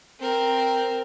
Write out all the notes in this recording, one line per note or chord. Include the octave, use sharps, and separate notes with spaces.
C4 A#4